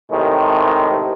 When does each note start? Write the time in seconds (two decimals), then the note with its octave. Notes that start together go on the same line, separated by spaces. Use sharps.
0.11 A2 C3 D#3 G#3